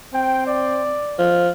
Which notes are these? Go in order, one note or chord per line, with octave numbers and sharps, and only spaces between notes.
C4 G5
D5
F3